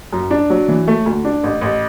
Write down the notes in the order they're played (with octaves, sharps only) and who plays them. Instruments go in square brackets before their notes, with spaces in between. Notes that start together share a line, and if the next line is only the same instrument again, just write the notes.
[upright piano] F#2
D4
F#3
E3
A3
D2
D4
A1
A1